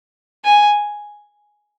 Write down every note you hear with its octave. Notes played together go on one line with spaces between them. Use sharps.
G#5